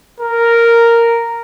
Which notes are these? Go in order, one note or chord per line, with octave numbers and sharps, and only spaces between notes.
A#4